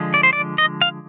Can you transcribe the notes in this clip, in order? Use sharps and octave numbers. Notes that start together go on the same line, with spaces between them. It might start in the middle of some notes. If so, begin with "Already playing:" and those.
Already playing: D3 F3 G#3
D5
C5
D5
D#5
F5